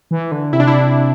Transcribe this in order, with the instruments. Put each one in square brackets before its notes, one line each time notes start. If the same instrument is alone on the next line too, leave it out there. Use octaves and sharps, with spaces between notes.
[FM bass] E3
D3
[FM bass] C3 [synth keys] E4
[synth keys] D4
E4